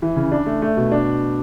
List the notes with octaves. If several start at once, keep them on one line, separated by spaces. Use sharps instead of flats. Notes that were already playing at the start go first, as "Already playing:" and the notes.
E3
C#3
D4
A3
A3
B2
D4